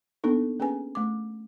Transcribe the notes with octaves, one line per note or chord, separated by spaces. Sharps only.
A#3 B3 D4 D#4 A4
A#3 C#4 G#4 B4 G#5
A3 D6